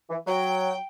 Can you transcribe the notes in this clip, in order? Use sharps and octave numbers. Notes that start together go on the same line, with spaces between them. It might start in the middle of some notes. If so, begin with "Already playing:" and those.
E3
F#3 G5